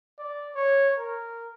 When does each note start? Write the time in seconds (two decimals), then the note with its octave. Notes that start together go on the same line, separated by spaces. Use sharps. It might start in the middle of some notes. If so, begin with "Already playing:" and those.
0.18 D5
0.55 C#5
0.98 A#4